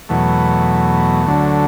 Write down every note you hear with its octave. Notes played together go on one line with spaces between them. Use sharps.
E2 B2 F#3 A3
D2 D3 F#3